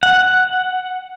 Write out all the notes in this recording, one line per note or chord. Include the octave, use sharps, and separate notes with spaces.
F#5